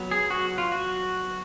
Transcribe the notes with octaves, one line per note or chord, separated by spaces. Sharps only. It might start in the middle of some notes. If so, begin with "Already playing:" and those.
Already playing: F#3 B3
G#4
F#4
F4
F#4